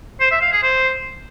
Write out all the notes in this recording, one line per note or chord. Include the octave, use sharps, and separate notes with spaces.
C5
E5
F5
G#4
C5